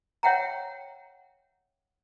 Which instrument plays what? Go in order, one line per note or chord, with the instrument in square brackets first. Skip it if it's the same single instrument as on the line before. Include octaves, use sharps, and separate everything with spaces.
[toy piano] C#5 E5 F#5 G5 A#5